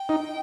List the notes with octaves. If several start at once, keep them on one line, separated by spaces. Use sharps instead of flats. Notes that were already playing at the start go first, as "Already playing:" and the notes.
Already playing: G5
D#4